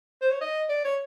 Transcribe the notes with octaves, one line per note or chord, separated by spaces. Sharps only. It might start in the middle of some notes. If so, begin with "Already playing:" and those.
C5
C#5
D#5
D5
C#5